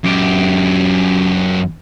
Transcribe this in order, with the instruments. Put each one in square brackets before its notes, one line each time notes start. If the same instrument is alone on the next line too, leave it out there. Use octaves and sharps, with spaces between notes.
[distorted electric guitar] F#2 G4